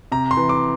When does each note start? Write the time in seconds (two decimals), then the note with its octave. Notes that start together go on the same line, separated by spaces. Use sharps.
0.12 C3 A#5
0.31 C6
0.37 E3
0.49 D6